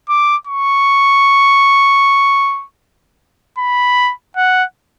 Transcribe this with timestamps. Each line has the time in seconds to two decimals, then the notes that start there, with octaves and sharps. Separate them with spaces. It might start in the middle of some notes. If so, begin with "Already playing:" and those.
0.09 D6
0.47 C#6
3.58 B5
4.37 F#5